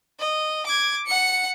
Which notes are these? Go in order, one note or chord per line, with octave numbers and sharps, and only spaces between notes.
D#5
D6 G#6
F#5 C#7